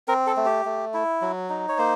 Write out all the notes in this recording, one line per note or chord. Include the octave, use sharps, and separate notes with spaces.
C4 A#4
A4
A3
G4
A3
E4
F#3
D#4
C#5
A#3 C5